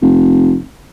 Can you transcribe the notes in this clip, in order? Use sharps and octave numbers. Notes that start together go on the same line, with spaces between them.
F1